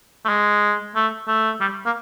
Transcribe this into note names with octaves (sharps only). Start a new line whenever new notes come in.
A3
G#3
A3
A3
G3
A#3